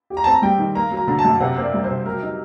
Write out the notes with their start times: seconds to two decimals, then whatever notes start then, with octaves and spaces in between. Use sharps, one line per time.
0.10 G4
0.17 A#5
0.24 C4 A5
0.32 A#5
0.42 G3 G5
0.58 D#3
0.75 A#3 A#5
0.91 F#3
0.97 A#5
1.08 D3 A#5
1.19 A5
1.25 F#2
1.40 C3 F#5
1.56 A#3 C5
1.62 D5
1.73 G3
1.84 C3 C5
2.05 F#3 A#4
2.22 D#4